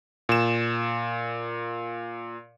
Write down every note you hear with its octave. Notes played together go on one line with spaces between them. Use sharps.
A#2 E7